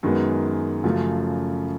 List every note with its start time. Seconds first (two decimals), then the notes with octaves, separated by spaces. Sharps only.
0.03 F#2 D#3 G#3 B3
0.84 F#2 C#3 F3 A3